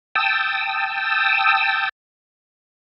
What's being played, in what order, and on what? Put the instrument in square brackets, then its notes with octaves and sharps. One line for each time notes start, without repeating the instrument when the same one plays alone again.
[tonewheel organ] G5 A5 D#6 E6